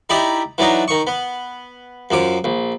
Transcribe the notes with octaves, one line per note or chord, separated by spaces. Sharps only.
D#4 E4 G4 D5
E3 F#3 D4 D#4
D#3 C#6
B3
F#2 F3 D6
A#1